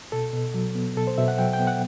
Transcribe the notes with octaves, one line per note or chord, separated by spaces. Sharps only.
B2 A4
B2
F#3
B3
B2 A4
C5
B2 E5
F#5
F#3 G5
G5
B3
F#5